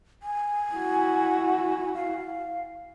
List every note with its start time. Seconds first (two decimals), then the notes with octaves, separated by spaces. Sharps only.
0.23 G#5
0.74 E4 F#4
1.95 F5